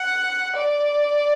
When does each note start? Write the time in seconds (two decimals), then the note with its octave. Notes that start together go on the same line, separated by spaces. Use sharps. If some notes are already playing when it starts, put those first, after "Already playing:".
Already playing: F#5
0.55 D5